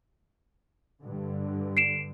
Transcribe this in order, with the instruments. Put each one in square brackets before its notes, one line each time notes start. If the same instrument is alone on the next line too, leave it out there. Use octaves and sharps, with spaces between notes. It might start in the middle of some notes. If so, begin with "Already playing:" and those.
[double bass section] G2 D3
[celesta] C7 D7 E7